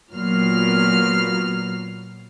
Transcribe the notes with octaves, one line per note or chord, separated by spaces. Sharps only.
A#2 F#3 B3 F6 C7